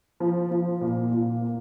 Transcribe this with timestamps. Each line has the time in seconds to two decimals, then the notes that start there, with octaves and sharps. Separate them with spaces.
0.20 F3
0.51 F3
0.81 A#2
1.11 A#2
1.42 A#3